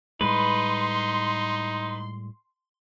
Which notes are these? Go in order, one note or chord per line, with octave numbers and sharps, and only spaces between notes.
A2 G3 G#3 D#4 B4 C6